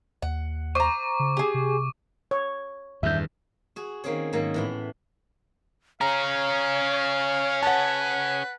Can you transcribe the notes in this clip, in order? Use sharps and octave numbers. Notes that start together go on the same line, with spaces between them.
D#2 F#5
C5 A#5 C#6 D6
C#3
G4 G#4
C3
C#5
E2 G2 D#3 G3 E5 G6
F#4 G#4
D#3 A#3 C4 C#4 G#4 C#5
G#2 D#3 F#3 A#3
A2 E3 B3
C#4 G#4 C#5 F5 A#5
B4 F#5 A5